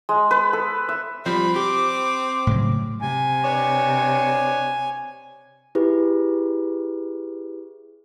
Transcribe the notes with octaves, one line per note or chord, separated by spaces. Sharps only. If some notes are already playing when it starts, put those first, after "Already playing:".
G#3
B4
A4
E5
F3 G3 C4 B5
G4 D6
A2 C#3 F#3
C3 G#5
D4 B4 C#5
E4 G4 G#4 B4